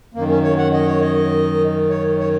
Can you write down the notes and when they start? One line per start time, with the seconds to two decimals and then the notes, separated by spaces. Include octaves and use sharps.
0.14 F#2 D#3 A#3
0.29 C#4
0.43 C#5
0.58 F#5
0.73 D#5
0.87 C#5
1.00 D#5
1.90 C#5
2.19 C#5